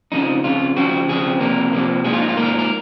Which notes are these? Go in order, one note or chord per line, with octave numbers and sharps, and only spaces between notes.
F2 C#3 F3 D#4
F2 C#3 F3 F4
F2 C#3 F3 C4 F#4
F2 C#3 F3 C4 G#4
F2 C3 F3 A#3 A#4
F2 C3 F3 A#3
G#2 F3 A#3 G#4
F4
D#4
F4
G#2 F3 A#3 A#4
A#4